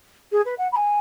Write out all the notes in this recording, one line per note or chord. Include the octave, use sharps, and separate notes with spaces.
G#4
B4
F#5
B5
G#5